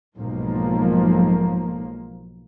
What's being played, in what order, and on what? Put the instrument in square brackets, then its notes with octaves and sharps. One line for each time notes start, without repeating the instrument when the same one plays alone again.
[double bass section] B1 G#2 F3 A#3